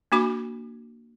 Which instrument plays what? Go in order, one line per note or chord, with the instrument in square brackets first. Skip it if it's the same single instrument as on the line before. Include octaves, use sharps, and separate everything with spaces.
[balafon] A#3 D4 F#4 B5 D6